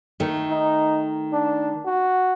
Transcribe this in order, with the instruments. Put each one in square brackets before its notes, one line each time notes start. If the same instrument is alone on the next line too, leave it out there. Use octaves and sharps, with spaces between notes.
[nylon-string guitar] D#3 A3
[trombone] D#4
D4
F#4